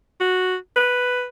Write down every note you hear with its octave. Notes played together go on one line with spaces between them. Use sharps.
F#4
B4